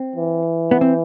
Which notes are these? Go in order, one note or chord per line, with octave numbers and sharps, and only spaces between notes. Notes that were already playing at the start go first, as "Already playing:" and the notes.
Already playing: C4
E3
B3
C4